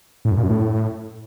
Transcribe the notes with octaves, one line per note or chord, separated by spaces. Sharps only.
A2
F#2
A#2
F#2
A2